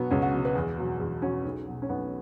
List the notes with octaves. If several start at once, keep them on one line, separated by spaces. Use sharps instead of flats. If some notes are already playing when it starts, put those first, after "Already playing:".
Already playing: B2 F#3 B3
C#2 C#4
F#4
B2 F#3
B4
E2 G#4
B2 F#3
E2
B2 F#3 C#4
B1
B2 F#3
C#4
B1 B3